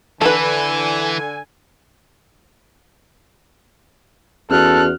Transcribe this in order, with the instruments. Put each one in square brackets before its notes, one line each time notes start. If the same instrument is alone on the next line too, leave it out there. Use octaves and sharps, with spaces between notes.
[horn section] D3 G#5 [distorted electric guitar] E3 [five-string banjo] A4 B4
[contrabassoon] E2 [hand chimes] C#4 F#4 [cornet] A4 [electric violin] F6 F#6